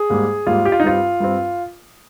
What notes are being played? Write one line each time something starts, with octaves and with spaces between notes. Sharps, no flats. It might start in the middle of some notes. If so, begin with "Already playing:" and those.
Already playing: G#4
G#2 G3 A#3
G#2 G3 A#3 F4
G4
F4
D#4
G2 G3 C4 F4
G2 G3 C4